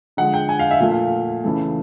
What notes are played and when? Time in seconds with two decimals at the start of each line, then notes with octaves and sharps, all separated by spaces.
0.17 D3 F3 G#3 F#5
0.34 G5
0.49 G#5
0.59 F5
0.71 E5
0.80 A#2 F3 A3
0.91 F5
1.44 C#3 E3 A3